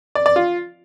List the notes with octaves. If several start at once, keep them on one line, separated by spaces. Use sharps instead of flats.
D5
D5
F4